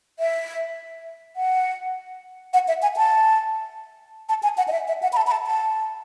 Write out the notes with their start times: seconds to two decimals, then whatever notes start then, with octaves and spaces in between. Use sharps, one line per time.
0.19 E5
1.36 F#5
2.53 F#5
2.68 E5
2.82 G#5
2.97 A5
4.29 A5
4.43 G#5
4.58 F#5
4.68 D#5
4.72 E5
4.88 E5
5.03 F#5
5.13 B5
5.17 A5
5.27 B5
5.32 A5
5.46 A5